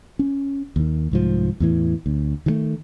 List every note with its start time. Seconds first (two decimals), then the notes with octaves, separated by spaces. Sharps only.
0.19 C#4
0.76 D#2 D#3
1.12 C2 G#2 F3
1.60 E2 A2 E3
2.06 D2
2.46 D#3 E3 A3